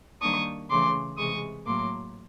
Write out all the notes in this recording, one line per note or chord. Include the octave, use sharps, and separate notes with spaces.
D#3 G3 A#3 D4 C#6 D#6
C#3 E3 A3 C6 D6
C3 E3 G#3 C#6 D#6
A2 F#3 A#3 C6 D6